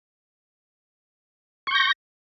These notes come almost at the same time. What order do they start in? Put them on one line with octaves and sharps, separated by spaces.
C#6 G6 A#6